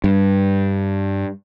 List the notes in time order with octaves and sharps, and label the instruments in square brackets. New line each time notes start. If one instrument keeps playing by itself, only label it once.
[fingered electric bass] G2